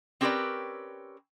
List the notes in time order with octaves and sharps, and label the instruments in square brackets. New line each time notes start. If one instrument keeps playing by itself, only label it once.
[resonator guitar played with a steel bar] C4 C#4 G4 A#4 B4 D5